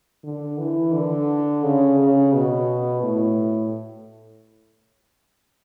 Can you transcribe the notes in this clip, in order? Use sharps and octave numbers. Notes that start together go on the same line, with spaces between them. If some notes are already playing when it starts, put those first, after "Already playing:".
D3
E3
D3
C#3
C#3
B2
A2